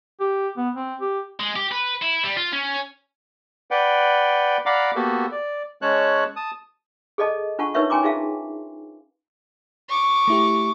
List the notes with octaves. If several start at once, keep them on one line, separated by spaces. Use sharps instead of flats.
G4
B3
C4
G4
G#3
G4
B4
E4
G3
F4
C#4
B4 D5 F#5 G5
D5 F5 F#5 A#5 B5 D6
A#3 B3 F#4 G4 A4
D5
G#3 C#4 C#5 A5 F#6
A5 D#6
G#4 A4 D5 D#5 A5
D4 F4 F#5 A5 C#6
D#4 A#4 B4 C#5 E5 C#6
C#4 G5 G#5 A#5 C6 D6
D#4 F4 G#4 E5 F5 A5
C#6 D6
A3 E4 G4